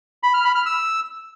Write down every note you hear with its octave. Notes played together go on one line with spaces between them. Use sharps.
B5
F6
B5
F6
E6